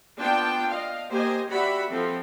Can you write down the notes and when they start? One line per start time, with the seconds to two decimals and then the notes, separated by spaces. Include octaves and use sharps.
0.18 B3 D4 F4 G5 A5
0.68 D#5 F5
1.10 A#3 G4 C5 D#5 G#5
1.49 F#4 G4 D5 E5 F#5 B5
1.89 F3 C4 A4